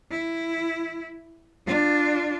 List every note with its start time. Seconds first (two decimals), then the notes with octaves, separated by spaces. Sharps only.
0.10 E4
1.67 D4 F4